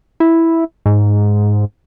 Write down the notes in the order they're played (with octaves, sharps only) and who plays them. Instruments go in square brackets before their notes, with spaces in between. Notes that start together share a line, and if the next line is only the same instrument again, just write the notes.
[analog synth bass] E4
G#2